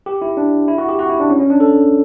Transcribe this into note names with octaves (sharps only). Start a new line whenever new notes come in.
G4
E4
D4
E4
F#4
G4
F#4
E4
D4
C#4
C#4
D4
A4